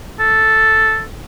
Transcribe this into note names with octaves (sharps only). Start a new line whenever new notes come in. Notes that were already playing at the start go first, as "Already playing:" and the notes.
A4